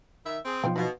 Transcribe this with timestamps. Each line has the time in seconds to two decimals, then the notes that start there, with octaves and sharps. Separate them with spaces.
0.25 D#3 E5
0.45 C4 G#4
0.64 B1 F3 F4 C5 G5
0.76 B2 D#4 F4